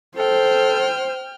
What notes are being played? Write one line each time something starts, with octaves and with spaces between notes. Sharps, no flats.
A4 C5 G5 F6